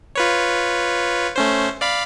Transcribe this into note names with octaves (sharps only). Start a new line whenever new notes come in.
F4 B4 C#5
A3 C#4 C5
D5 F5 B5